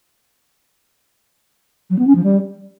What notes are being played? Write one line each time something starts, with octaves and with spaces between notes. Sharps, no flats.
F#3
B3
C#4
F3
G3